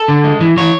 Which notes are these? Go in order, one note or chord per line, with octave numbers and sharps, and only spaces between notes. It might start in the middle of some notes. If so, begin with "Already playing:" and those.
Already playing: A4
D3
G#3
E3
E3 C#5